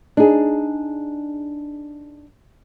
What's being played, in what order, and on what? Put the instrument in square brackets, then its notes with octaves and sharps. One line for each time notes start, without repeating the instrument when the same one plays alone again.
[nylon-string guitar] D4 D#4 G#4